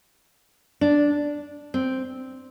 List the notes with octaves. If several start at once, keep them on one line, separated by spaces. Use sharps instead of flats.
D4
C4